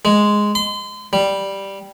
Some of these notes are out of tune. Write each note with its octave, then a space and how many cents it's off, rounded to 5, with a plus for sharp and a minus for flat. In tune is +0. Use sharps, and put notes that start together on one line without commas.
G#3 +0
C6 -35
G3 +0